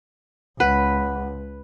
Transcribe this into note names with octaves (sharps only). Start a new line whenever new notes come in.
C#2 B4 F#5